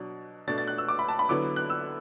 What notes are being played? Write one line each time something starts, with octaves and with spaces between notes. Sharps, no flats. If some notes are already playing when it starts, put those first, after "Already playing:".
Already playing: B2 F#3 D4
B2 A3 D4 A6
A6
F#6
E6
D6
B5
A5
B5
D3 F#3 B3 E4 D6
F#6
E6